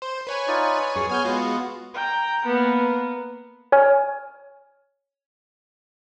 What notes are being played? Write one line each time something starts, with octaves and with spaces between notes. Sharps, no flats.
C5
B4 C#5 G#5
D#4 F4 D5
F#2 G#4 C#6
B3 C#5 G#5 F6 G6
G#3 B3 F4 F#4
G5 A#5
A#3 B3
C#5 G#5 F6